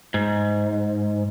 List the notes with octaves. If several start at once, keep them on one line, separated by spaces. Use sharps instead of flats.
G#2